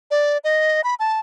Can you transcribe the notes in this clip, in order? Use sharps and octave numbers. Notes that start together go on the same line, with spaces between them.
D5
D#5
B5
A5